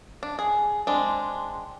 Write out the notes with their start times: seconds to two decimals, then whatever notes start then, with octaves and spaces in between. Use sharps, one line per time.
0.23 D4
0.39 G#4
0.87 G#3 C4 D4